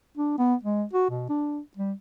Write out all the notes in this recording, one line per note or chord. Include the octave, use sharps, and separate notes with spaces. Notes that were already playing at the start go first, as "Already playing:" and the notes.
D4
B3
G#3
F#4
B2
D4
G3